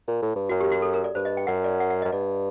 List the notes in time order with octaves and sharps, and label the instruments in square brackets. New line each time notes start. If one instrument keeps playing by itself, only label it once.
[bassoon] A#2
A2
G2
[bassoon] F#2 [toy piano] F#4
[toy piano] G4
F#4
A4
A#4
D5
[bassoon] G2 [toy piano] C5
[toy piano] D#5
G5
[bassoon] F#2 [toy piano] F#5
[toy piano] D5
F#5
F#5
D#5
[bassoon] F#2
[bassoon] G2 [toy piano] D5